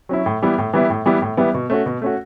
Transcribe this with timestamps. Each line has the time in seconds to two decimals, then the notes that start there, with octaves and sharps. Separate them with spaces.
0.09 F#3 C#4 E4
0.26 A2
0.42 E3 G3 B3 E4
0.58 A2
0.73 E3 G3 B3 E4
0.90 A2
1.06 E3 G3 B3 E4
1.22 A2
1.37 E3 G3 B3 E4
1.54 B2
1.70 A3 C#4 F#4
1.86 B2
2.02 A3 C#4 F#4